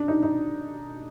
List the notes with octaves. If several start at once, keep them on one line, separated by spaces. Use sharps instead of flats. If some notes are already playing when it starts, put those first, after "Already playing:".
Already playing: D4
D#4
D#4